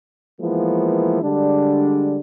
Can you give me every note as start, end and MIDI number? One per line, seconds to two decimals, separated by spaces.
0.41 1.18 52
0.41 1.18 53
0.41 1.18 56
0.41 1.18 58
0.41 1.18 59
0.41 1.18 64
1.22 2.19 50
1.22 2.19 55
1.22 2.19 56
1.22 2.19 62